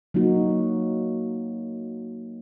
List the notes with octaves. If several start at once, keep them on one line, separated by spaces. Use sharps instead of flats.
F#3 A#3 D#4 F#4